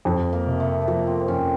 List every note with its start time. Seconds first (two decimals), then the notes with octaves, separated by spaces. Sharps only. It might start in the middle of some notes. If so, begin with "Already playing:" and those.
0.05 F2
0.33 A#3
0.47 C3
0.60 A3
0.82 A3
0.88 F3 A#3
1.07 C4
1.20 C4
1.28 F2 C#4